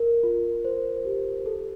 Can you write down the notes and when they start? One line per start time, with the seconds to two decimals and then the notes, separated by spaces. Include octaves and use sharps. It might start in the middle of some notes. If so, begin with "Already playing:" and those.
Already playing: A#4
0.23 F4
0.65 C5
1.05 G4
1.46 A4